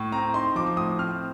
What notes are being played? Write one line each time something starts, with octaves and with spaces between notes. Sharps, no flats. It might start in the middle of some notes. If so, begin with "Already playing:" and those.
Already playing: A2
C4 A#5
D#4 C6
F3 D6
A2 D#6
C4 F6